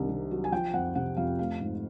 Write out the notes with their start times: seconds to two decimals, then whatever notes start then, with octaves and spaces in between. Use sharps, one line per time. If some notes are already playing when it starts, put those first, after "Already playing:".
Already playing: C2 D#3 D4
0.09 C3
0.31 F#3
0.44 G#5
0.52 F3 G5
0.74 F2 F#5
0.95 C3 F#5
1.17 F2 F5
1.39 A3 F5
1.61 G#2